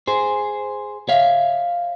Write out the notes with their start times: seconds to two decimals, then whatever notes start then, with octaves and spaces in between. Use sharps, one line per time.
0.08 G#4 C5
1.09 C#5 E5 F5